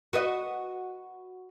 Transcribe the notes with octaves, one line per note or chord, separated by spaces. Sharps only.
F#4 B4 D#5